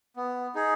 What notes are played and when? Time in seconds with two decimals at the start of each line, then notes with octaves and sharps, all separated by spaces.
0.16 B3
0.55 D#4 G#4